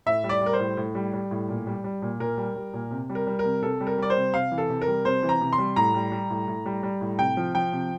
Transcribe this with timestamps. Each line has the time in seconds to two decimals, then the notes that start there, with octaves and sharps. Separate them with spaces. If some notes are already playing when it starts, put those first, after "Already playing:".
0.06 A2 E5
0.24 G3
0.29 D5
0.41 G3 A#4
0.53 C5
0.59 A2
0.77 A2
0.95 G3
1.13 G3
1.31 A2
1.49 A#2
1.67 G3
1.84 G3
2.02 A#2
2.20 A#2 A#4
2.37 G3
2.56 G3
2.74 A#2
2.91 C3
3.09 G3
3.15 A#4
3.27 G3
3.39 A#4
3.45 C3
3.63 C3 A4
3.81 G3
3.87 A#4
3.98 G3 D5
4.10 C5
4.16 C3
4.34 C3 F5
4.51 E3
4.58 A4
4.69 C3
4.82 A#4
4.87 G3
5.05 C3 C5
5.23 E3
5.29 A#5
5.41 C3
5.53 C6
5.58 G3
5.76 A2 A#5
5.94 G3
6.12 G3
6.30 A2
6.48 A2
6.66 G3
6.83 G3
7.01 A2
7.18 C3 G5
7.37 F3
7.54 F3 G5
7.72 C3